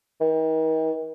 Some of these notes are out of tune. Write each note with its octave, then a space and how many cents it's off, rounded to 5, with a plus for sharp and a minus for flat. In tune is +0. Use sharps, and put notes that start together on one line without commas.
D#3 +40